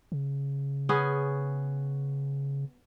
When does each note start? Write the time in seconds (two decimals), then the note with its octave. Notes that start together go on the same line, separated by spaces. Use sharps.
0.12 C#3
0.89 B3 C#4 G#4